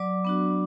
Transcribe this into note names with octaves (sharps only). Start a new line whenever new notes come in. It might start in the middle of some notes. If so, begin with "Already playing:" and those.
Already playing: F#3 D5 D6
B3 D4 F#4